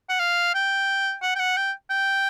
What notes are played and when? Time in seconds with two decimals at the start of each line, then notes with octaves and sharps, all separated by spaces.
0.09 F#5
0.19 F5
0.54 G5
1.22 F#5
1.35 G5
1.39 F#5
1.56 G5
1.90 G5